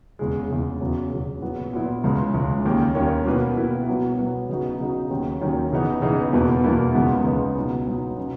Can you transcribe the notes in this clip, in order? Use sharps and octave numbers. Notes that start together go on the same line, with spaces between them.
E2 C#3 G#3
E2 C#3 G#3
E2 C#3 F#3
E2 C#3 F#3
A#2 F#3 B3 E4
A#2 F#3 B3 E4
C#2 C#3 G#3
C#2 C#3 G#3
D#2 D#3 A#3 C#4
D#2 D#3 A#3 C#4
B2 A#3 E4 B4
B2 A#3 E4 B4
B2 F#3 B3
B2 F#3 B3
C#3 F#3 B3 D#4 F#4
C#3 F#3 B3 D#4 F#4
D#2 D#3 F#3 C#4
D#2 D#3 F#3 C#4
C#3 E3 B3 D#4
C#3 E3 B3 D#4
E2 B2 A#3 E4 B4
E2 B2 A#3 E4 B4
C#2 C#3 E3 B3 D#4
C#2 C#3 E3 B3 D#4
B2 F#3 B3 D#4
B2 F#3 B3 D#4
B2 F#3 C#4